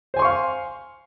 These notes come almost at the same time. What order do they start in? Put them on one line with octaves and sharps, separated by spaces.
C5 G#5 C6 C#6 F5